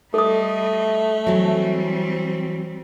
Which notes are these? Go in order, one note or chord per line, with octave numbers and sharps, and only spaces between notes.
G3 A3 A4 D#5 D#6
E3 F#3 G3 C4